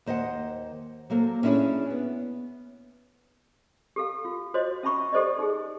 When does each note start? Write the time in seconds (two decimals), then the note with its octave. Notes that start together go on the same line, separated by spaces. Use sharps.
0.06 D#2 C5 D#5 E5 F#5
1.10 F#3 A#3 A4 C5
1.43 C#4 D4 E4 G4 G#4 C#5
1.91 B3
3.96 G4 A4 F5
4.25 F4
4.54 F#4 C5 C#5 D#5 C6
4.83 C#4 E5 A5 B5 C#6
5.13 G4 A4 C5 D5 D#5
5.39 D#4 G#4